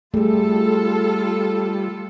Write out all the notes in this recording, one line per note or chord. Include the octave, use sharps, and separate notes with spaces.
G3 A3 F4 G#4 A4